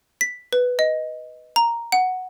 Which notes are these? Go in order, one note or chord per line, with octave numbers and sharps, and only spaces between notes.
B6
B4
D#5
A#5
F#5